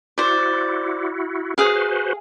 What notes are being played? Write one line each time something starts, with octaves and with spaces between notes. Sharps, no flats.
E4 F#4 C5 D5
F#4 G#4 B4 C5 F5